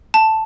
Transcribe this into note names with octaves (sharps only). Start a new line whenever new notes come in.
A5